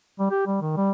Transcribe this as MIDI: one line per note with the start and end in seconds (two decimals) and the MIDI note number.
0.20 0.29 55
0.31 0.44 67
0.47 0.57 55
0.61 0.75 51
0.77 0.92 55